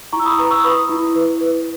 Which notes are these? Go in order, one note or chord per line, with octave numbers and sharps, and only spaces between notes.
E4 A#5 C#6
E6
B5 D#6
B4 A#5 C#6
C#6 E6
B4 B5 D#6
E4
B4
B4